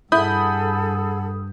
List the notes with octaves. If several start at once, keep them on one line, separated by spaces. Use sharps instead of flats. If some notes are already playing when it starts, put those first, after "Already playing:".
G2 E4 G#4 A4 F#5 B5 D#6 G6